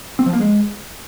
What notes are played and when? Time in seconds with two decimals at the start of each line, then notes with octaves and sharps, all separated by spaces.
0.19 C4
0.26 F3
0.33 A#3
0.40 G#3